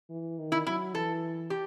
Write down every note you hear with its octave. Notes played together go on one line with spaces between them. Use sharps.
E3
D#3
E4
F#3 E4
E3 A4
G4